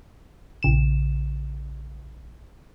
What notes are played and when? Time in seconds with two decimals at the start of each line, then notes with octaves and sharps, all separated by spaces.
0.63 A#1 C#3 E7